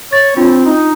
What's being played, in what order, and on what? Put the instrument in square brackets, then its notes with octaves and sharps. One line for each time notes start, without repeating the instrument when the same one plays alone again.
[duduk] C#5 [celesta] A6
[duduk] C4 [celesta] D4 F4
[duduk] D#4